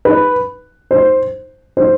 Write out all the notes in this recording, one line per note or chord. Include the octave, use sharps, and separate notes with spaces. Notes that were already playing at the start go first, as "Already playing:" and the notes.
B4
C5
C5